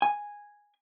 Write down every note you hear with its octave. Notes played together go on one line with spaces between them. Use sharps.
G#5